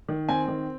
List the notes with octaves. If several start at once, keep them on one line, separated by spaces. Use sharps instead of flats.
D#3
C4 G#5
D#3